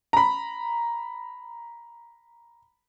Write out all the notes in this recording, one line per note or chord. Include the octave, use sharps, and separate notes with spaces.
A#5 B5